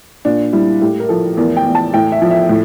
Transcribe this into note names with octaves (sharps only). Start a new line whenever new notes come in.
A#2 D4
G3 E4
A2 G4
A#4
F3 A4
E2 A#4
G5
E2
A5
A2 G5
E5
F3
E5
A2